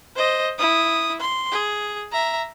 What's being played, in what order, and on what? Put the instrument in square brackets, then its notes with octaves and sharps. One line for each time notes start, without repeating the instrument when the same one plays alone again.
[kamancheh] C5 D#5
E4 D#6
C6
G#4
E5 A#5